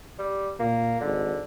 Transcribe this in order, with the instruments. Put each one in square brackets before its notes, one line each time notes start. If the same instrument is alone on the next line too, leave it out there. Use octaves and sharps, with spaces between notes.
[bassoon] G3
[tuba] A#2 [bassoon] A#3
[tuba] G#1 [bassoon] D3